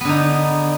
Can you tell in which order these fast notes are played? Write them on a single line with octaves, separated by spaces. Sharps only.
B3 D3 D#4